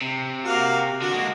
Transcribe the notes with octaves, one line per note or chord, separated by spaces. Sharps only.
C3
A#3 F#4 F5
D3 F#4
G#3 A#3